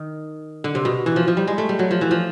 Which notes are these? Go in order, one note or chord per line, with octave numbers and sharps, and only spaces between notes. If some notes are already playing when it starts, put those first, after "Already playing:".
Already playing: D#3
D3
C3
B2
E3
F3
F3
G3
G#3
A3
G3
F#3
F3
E3
F3